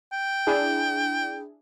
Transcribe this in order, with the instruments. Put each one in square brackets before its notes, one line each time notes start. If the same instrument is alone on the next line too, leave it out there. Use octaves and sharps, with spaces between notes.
[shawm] G5
[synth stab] D4 E4 G#4